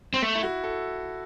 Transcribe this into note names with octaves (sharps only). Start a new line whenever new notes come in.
C4
A3
E4
F#4
A4